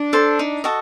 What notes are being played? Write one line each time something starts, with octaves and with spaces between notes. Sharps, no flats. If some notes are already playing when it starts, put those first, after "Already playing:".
Already playing: D4
A4 C5
D#4
F#4 A4 D#5